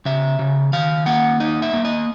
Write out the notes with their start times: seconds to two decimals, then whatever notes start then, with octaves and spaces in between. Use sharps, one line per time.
0.05 C#3 E5
0.39 C#3
0.73 D#3 F5
1.06 A#3 F#5
1.40 D#4 D#5
1.62 E5
1.73 A#3
1.85 D#5